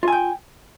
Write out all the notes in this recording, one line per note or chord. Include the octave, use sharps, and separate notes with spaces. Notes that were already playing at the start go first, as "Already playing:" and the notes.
F4 G5 G#5